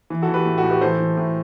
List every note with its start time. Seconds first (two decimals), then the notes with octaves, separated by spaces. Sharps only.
0.10 E3
0.22 F#4 A4
0.28 E3
0.34 G4 B4
0.46 A2
0.58 F#4 A4
0.63 A2
0.70 G4 B4
0.81 E3 A4 C5
0.99 E3
1.17 A2